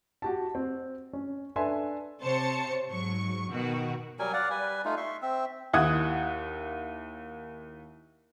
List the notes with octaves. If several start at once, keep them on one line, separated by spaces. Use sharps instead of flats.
F#4 G4 A5
C4
C#4
D4 A4 B4 E5 G#5 C6
C3 C5 C#5 A5 C#7
G#2 F#3 C#6
B2 D#3 F#4
F#3 G3 A#4 G#5
D5 F5 F#5
G3 B4 G#5
A3 D#4 F4
E5 C6 C#6
C4 E5
D#2 E4 F#5 D#6 F#6 G#6